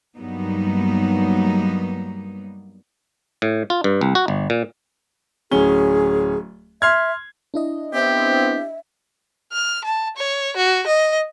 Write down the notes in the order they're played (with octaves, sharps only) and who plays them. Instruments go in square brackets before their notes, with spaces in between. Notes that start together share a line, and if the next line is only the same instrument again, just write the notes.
[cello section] G2 F#3 G3 A#3 B3 D#4
[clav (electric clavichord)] A2
F4
G2
C2
F#4
G1
A#2
[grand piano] D1 C#4 G7 [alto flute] G#4
[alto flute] E5 [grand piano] C6 F6 G#6
[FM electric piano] D4 E4 D#5
[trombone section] B3 C4 [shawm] G4 [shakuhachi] E5
[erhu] F6
A5
C#5
F#4
D#5